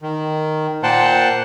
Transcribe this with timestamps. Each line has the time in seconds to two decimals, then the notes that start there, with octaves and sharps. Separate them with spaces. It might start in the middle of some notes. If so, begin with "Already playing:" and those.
0.02 D#3
0.83 A#2 A#3 C5 F#5 G5 A5